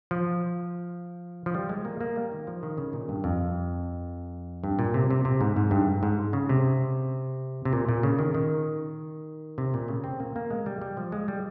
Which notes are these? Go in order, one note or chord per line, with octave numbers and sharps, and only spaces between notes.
F3
F3
G3
G#3
A#3
A#3
G3
D#3
F3
D#3
C#3
A#2
G2
F2
G2
A#2
C3
C3
C3
G#2
G#2
G2
G#2
C#3
C3
C3
A#2
A#2
C#3
D#3
D#3
C3
A#2
C#3
C4
A#3
A#3
G#3
G3
G3
F3
G#3
G3